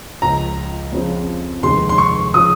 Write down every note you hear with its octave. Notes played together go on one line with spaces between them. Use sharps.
C#2 C#3 F3 A#5
F2 C#3 F3 C4
F1 D#2 D#3 G#3 C6
C6
C#6
C#3 F3 D#6